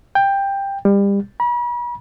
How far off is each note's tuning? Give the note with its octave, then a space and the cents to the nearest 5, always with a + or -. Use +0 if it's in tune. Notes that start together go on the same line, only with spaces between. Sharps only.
G5 +15
G3 +30
B5 -40